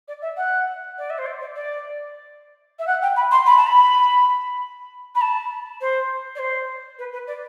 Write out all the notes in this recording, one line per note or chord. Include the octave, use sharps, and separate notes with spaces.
D5
E5
F#5
D5
E5
C5
D5
D5
D5
E5
F#5
G5
B5
C6
B5
A5
B5
B5
A5
C5
D5
C5
B4
B4
D5